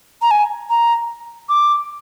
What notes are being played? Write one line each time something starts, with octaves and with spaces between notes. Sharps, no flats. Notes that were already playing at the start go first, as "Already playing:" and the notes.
A#5
G#5
A#5
D6